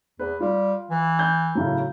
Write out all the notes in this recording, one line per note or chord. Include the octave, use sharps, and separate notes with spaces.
E2 B4
G3 F4
E3
G6
A2 C#3 F#3